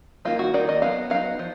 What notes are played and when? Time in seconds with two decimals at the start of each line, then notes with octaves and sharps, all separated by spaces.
0.25 D#3 A#3 D#4 F4
0.39 F#4
0.54 D#3 A#3 D#4 D5
0.69 D#5
0.82 F#3 B3 D#4 F5
1.10 F#3 B3 D#4 F5
1.39 F3